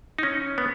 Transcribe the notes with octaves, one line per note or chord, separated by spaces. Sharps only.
D#4
C#4
B3